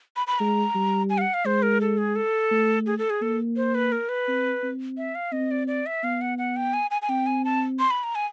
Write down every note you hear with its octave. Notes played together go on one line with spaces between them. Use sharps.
B5
B5
G#3 A#5
G3
G#5
F5
F#5
F5
G#3 C5
A#4
A4
G#4
A4
A3
G#4
A4
G#4
A#3 A4
C5
B4
A#4
B4
C4
C4
E5
F5
C4 D#5
D5
D5
E5
B3 F5
F#5
F#5
G5
G#5
G#5
G#5
C4 G5
G#5
A5
C6
B5
A#5
G#5